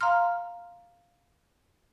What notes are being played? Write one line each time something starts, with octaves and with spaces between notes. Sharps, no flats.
F5 A#5 C6 F6